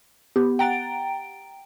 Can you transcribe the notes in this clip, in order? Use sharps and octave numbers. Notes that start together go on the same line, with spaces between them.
B3 G4
F#5 G5 A#5 A6 D7